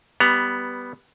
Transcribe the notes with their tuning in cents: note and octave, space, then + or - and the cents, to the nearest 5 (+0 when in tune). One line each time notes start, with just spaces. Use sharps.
G3 +0 B3 +0 A#5 +0